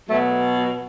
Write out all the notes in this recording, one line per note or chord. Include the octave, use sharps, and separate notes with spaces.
B2 F#3 A3